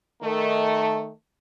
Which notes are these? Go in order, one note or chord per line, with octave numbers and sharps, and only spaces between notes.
D#3 A3